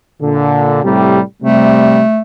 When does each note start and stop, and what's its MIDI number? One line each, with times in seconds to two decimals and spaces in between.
0.21 0.84 46
0.21 0.84 50
0.84 1.20 45
0.84 1.20 48
0.84 1.20 55
1.42 2.01 48
1.42 2.01 55
1.42 2.21 57